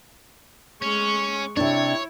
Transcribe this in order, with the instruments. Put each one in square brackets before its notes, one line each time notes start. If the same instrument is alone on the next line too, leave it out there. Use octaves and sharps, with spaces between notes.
[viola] G#3 C#6 [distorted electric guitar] C#4
[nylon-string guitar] C3 D4 [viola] E4 [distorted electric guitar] C#5